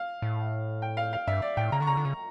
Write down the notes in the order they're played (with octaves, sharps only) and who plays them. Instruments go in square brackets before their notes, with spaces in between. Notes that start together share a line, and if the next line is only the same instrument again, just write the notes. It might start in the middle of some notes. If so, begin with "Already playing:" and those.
Already playing: [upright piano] F5
[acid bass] A2
[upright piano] G5
F5
F5
[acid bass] G2 [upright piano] E5
[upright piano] D5
[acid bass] A2 [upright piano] G5
[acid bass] C#3 [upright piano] A#5
[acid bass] D3 [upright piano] C#6
[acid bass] C#3 [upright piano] A#5
[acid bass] D3
C#3